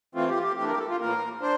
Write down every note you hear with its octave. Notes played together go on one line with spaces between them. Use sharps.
E3 A3 C4 F4
G4
F4
G4
E3 A3 D4 G4
A#4
G4
A4
F4
A2 E3 A#3 A#4
D4 C5